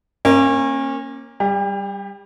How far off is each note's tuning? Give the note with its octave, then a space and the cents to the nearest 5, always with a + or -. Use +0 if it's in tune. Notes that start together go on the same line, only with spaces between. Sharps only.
A#3 +0 C#4 -30
G3 +0 G4 +40